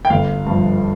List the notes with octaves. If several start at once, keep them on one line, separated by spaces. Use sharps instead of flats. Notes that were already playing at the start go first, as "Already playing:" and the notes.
G5
G1 F5
G2 F3